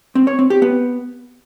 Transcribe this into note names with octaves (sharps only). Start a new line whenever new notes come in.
C4
C#5
C4
G4
B3